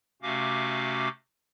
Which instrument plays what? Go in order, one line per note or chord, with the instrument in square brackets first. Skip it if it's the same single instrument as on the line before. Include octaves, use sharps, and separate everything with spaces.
[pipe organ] C3 A3 C#4 F#4 F5 D6